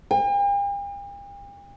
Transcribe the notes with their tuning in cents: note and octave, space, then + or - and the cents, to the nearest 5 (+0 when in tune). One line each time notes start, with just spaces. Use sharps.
G5 +45